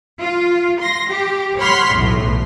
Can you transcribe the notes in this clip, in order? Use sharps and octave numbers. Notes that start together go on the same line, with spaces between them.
F4
C6 A#6
G4
C#5 F#5 B5 C6 F6 B6
B1 E2 A2